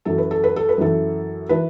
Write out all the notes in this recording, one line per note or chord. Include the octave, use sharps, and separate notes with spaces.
F#2 E3 A4
B4
A4
B4
A4
B4
F#2 E3 A4
E3 B4